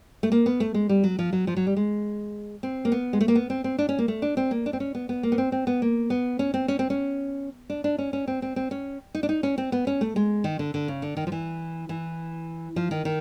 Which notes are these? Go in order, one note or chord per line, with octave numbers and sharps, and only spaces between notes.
A3
A#3
B3
A3
G#3
G3
F#3
F3
F#3
F3
F#3
G3
G#3
C4
A#3
B3
G#3
A3
A#3
B3
C4
C4
D4
C#4
A#3
A3
D4
C4
A#3
D4
C4
C#4
B3
B3
A#3
B3
C4
C4
B3
A#3
B3
C#4
C4
C#4
C4
C#4
D4
D4
C#4
C#4
C4
C4
C4
C#4
D#4
D4
D#4
C#4
C4
B3
C#4
A3
G#3
D#3
D3
D3
C#3
D3
D#3
F3
E3
E3
F3
D#3
D#3